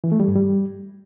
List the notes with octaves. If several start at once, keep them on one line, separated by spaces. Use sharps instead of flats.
E3
A3
G3
G2
G3